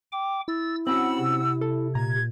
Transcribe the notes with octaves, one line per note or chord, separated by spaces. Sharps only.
G5 D6
E4 E6 A6
C4 C#4 F#4 F#5 B5 E6
C3
A4
A#2 A#5 G#6